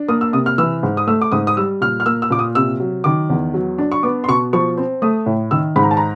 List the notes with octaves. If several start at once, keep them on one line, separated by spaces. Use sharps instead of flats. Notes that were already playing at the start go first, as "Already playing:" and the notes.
Already playing: D4
A#3 D#6
E6
C3 D#6
F6
E3 E6
G#2
D#6
A3 E6
D6
G#2 D#6
D#6
G3 E6
A#2 F6
F6
A#3 E6
E6
A#2 D6
D#6
C3 E6
F#3
D#3 D6
E2
F#3
D4
C#6
B3 D6
C6
B2 C#6
F3 C#6
C4
A3 D#6
A2
D#3 E6
G#2 B5
A#5
A5
A#5